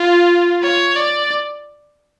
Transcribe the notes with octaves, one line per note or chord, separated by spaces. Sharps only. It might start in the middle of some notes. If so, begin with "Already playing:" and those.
Already playing: F4
C#5
D5